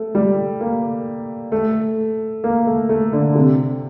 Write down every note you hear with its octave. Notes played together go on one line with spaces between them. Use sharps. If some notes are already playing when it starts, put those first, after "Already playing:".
Already playing: A3
G3
A#3
A3
A#3
A3
A3
D3
C3